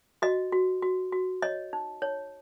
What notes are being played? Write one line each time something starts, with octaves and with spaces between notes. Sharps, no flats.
F#4 D#5
F#4
F#4
F#4
C#5 D#5
D#4
D#4 C#5